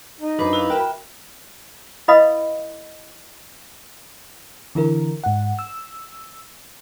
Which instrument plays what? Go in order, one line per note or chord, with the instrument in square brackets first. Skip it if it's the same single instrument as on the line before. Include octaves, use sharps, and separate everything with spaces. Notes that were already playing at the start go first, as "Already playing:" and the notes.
[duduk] D#4
[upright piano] F#2 [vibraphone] D4 C5 D6 [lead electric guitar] B4
[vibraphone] E4 F#4 F5
[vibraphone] F#4 E5 B5 [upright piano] A#4 G5
[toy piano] E4 B4 D#5 F5 B5 D#6
[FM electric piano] D3 E3 E4 A#4
G#2 F#5
E6